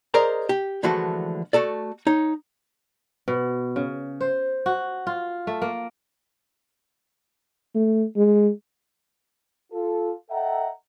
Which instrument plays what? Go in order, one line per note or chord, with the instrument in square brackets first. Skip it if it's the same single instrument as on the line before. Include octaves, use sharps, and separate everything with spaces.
[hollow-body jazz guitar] G#4 A#4 C5 D5 D#5 A#5
G4
D3 E3 F3 G#3 A3 F#4
A3 F#4 A4 D5
D#4 C#5
[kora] B2
C#3
C5
F#4
F4
A3
A#3
[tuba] A3
G#3
[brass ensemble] F4 A4
A4 D#5 E5 F#5 G5 A#5